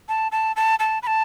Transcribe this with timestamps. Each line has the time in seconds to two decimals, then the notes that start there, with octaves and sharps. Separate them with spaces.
0.09 A5
0.32 A5
0.56 A5
0.79 A5
1.03 B5
1.07 A5